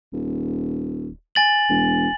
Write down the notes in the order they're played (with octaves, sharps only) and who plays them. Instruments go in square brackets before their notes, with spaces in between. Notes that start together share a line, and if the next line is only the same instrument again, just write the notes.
[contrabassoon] D#1
[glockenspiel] G#5 A6 F#7
[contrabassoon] E1